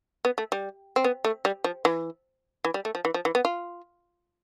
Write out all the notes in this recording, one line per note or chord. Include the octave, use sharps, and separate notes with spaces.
B3
A3
G3
C4
B3
A3
G3
F3
E3
E3
G3
A3
F3
E3
F3
E3
B3
F4